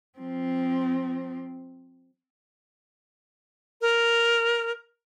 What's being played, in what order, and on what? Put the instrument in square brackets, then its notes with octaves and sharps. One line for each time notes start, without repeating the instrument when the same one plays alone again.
[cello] F3 C4
[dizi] A#4